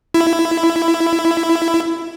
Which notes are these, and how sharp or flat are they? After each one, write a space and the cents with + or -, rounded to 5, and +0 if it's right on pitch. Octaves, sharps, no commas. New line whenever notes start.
E4 +15